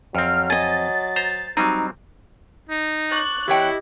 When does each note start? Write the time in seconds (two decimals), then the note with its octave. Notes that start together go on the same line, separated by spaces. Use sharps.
0.15 F2 F#3 C4 F6
0.50 D#5 G#5 A6
1.16 C5 A#5
1.57 F#3 G3 C4 D#4
2.69 D#4
3.11 C#6 D6 F#6 A6
3.48 E2 E4 G4 C#5 D#5 G5